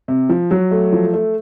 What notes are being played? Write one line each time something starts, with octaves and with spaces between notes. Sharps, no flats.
C3
F3
F#3
A3
F3
A3